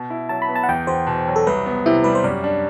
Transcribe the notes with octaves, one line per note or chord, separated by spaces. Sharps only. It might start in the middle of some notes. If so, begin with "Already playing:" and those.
Already playing: B2
E4
F#3 A5
B5
B3
A5
F#5
E2 G5
E2 C5
B2
F#3
A4
C2 B4
B3
C3 E4
G3 B4
C5
F#2 D5
D4